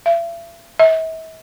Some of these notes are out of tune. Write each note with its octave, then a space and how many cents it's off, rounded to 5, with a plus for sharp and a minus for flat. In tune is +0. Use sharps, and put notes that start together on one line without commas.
E5 +45
E5 -40